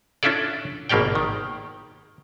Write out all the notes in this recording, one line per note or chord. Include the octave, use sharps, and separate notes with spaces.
C#4 D4 E4 F4 A4 D5
G#1 B2 A#3 G4 D5 G5
D#3